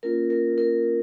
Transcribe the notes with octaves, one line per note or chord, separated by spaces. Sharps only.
A#3 C#4 F4 A#4
A#4
A#4